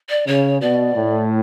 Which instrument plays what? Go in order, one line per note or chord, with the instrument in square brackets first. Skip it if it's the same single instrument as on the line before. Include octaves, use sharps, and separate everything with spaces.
[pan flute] D5
[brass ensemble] C#3 [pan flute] C#5
[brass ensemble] B2 [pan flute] D5
[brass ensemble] A2